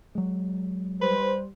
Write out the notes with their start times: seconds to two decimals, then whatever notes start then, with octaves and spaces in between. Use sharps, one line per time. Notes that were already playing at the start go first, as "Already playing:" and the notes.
0.15 F#3 G#3
1.01 G3 B4 C5